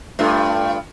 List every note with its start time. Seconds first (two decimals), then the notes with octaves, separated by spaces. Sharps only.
0.19 G2 A3 F4